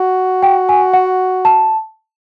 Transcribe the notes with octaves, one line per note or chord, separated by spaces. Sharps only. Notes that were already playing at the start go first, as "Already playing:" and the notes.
Already playing: F#4
G5
G#5
F#5
A5